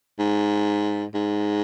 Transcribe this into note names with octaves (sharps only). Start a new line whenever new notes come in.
G#2
G#2